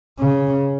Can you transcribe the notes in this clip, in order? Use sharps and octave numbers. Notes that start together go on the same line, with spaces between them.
C#3